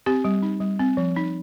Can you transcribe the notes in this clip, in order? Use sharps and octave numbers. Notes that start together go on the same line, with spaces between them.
C4 G4
G3
D#4
G3
C4
F3
D#4